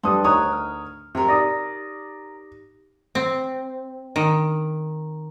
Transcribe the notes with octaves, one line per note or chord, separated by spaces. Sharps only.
G2 D4 G4 A4 B4 C6 D#6
D2 D#4 A#4 C#5 D#5 D#6 F#6
F6
C3 A#4 C#5
D#4 G4 D5 D#6 A#6
C4
D#3